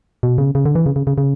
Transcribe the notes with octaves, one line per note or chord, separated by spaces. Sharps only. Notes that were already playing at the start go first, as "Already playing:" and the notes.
B2
C#3
C#3
D3
E3
C#3
C#3
C#3
C#3